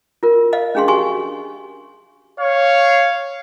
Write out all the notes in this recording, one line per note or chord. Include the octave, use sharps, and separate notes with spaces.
F4 A#4
D#5 F5
C#4 D4 G#4 F5 C6
F#4 G4 G#5 C6 C#6
C#5 F5